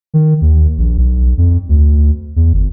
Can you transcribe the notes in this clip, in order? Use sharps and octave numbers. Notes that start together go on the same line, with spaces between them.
D#3
D#2
A#1
B1
F2
D2
E2
G1